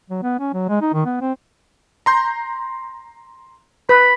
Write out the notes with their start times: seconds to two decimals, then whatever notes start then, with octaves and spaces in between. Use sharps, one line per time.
0.10 F#3
0.23 B3
0.39 C#4
0.54 F#3
0.69 G#3
0.81 D#4
0.94 D#3
1.05 B3
1.21 C4
2.06 A#5 C6 G6
3.89 B4 B5